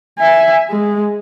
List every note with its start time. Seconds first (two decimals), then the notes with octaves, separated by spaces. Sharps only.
0.19 E5 G#5
0.70 G#3